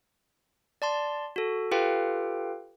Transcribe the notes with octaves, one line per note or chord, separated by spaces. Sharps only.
D5 A5 C6
F#4 A4
F4 G4 A4 B4 F5 G5